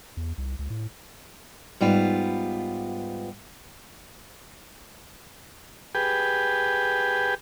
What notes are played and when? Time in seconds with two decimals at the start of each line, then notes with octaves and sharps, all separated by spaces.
0.17 E2
0.38 C2
0.59 C#2
0.70 A2
1.81 G#2 G3 B3 F4
5.95 G4 G#4 B4 G5